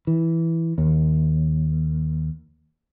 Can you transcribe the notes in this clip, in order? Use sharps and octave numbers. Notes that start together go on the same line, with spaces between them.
E3
D#2